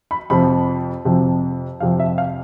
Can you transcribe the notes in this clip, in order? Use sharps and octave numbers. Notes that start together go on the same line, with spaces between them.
B5
F2 C3 F3 B5
F2 C3 F3
F2 C3 F3 F5
E5
F5